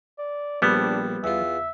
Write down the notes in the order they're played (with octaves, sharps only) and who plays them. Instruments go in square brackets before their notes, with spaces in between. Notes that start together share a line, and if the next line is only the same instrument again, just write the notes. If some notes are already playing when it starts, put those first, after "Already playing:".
[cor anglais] D5
[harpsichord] A#1 C4 [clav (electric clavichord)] G3 B3 [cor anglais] D4
[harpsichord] E2 F4 [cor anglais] E5